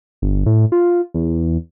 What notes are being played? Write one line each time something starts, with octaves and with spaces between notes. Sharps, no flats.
G1
A2
F4
E2